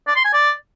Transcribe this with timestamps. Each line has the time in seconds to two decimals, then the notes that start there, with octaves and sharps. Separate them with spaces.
0.07 D5
0.16 C6
0.25 G#5
0.33 D5